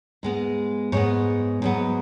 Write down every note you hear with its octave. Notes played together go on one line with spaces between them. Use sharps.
G#2 G#3 B3
G#2 G#3 B3 C#5
G#2 F#3 B3